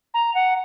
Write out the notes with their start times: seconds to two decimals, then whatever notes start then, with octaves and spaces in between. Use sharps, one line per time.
0.14 A#5
0.35 F#5